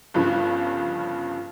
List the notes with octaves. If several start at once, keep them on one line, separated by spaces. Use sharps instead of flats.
G1 G2 C#3 F3